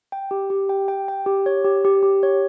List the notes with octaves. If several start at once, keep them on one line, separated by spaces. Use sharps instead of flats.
G5
G4
G4
G5
G5
G5
G4
C#5
G4
G4
G4
C#5